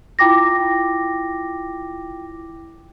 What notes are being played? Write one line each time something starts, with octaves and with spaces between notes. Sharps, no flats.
E4 F4 G5 D6 A#6